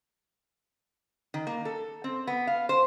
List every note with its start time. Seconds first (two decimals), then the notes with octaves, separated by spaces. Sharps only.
1.34 D#3
1.47 A#3
1.65 A4
2.04 C4
2.27 B3
2.47 F5
2.69 C5